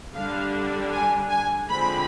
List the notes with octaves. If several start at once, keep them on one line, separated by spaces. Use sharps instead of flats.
D3 G3 D4 F5
G#5
G#5
D3 F3 G#3 C4 B5